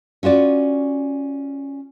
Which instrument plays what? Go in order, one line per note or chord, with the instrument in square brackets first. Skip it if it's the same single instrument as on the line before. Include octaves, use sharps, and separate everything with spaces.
[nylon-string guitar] C#4 F4 F#4 D5